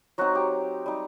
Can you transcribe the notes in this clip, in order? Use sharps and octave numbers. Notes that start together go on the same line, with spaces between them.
F#3 C4 D#4 F#4
G4
G3 D#4